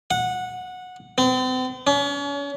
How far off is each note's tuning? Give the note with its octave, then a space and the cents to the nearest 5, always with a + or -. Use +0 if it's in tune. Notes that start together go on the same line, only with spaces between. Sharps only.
F#5 -15
C4 -40
C#4 +35